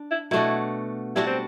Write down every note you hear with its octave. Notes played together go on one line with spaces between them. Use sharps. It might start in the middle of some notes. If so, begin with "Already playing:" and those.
Already playing: D4
E4
B2 A3 D4 E4 F#4
G3 D4 E4 F#4
C4